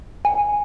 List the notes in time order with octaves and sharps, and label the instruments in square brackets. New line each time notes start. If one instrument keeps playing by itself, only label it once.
[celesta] G#5